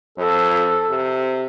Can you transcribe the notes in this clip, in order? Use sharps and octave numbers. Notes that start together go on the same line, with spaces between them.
F2 A4
C3